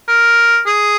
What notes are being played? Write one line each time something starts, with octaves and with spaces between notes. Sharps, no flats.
A#4
G#4